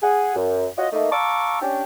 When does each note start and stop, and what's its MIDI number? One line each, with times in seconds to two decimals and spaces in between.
0.02 0.34 68
0.02 0.34 78
0.35 0.66 42
0.78 0.87 65
0.78 0.87 66
0.78 0.87 73
0.78 0.87 75
0.92 1.08 57
0.92 1.08 58
0.92 1.08 63
1.11 1.58 77
1.11 1.58 81
1.11 1.58 82
1.11 1.58 85
1.11 1.58 86
1.11 1.58 88
1.61 1.84 61
1.61 1.84 62
1.61 1.84 67